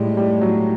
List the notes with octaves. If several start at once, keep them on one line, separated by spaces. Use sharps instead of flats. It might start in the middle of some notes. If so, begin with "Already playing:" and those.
Already playing: A2 G3 G#3
G3
F#3